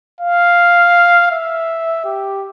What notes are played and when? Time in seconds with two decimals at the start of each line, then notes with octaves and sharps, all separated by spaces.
0.21 F5
1.31 E5
2.05 G4